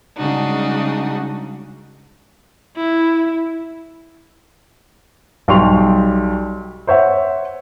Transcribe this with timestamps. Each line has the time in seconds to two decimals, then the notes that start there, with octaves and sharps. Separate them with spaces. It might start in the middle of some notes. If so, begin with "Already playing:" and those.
0.16 C#3 G3 G#3 D4 D#4 F#4
2.77 E4
5.48 B1 G3 D5 C6 C#6 F7
6.87 C5 C#5 E5 F#5